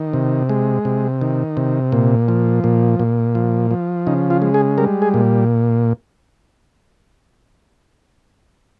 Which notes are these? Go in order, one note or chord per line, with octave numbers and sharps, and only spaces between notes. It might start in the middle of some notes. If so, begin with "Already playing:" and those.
Already playing: D#3
C3
G#3
C3
D#3
C3
A#2
F3
A#2
A#2
F3
F3
C#3 D#4
F4
G#3
G#4
G3 A#4
G#4
A#2